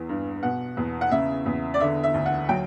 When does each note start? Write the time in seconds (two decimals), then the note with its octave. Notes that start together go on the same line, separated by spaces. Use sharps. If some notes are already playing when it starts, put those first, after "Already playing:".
Already playing: E2 E3
0.09 G2
0.43 B2 F#5
0.77 E2
1.01 F#5
1.11 C#3 E5
1.46 E2
1.74 D5
1.80 D3 E5
2.03 E5
2.14 D2
2.26 F#5
2.49 F#3 G5